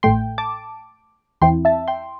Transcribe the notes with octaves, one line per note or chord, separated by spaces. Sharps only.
A1 A2 A3 G5 C6
A5 D6
E2 E3 C4 E4 G5 C6
E5 A5
G5 C6